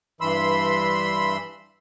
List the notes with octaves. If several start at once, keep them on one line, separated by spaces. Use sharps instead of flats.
G2 E3 B5 C6 E6